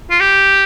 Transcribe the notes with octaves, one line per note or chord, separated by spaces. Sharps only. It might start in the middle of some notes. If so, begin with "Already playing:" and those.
F4
G4